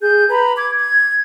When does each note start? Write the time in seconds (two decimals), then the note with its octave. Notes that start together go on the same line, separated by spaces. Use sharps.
0.01 G#4 G6
0.29 B4 A#5 B5
0.56 D6 G#6
0.79 G#6